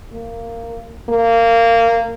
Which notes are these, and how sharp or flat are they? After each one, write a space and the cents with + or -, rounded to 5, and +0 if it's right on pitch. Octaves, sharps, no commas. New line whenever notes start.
A#3 -15
A#3 -20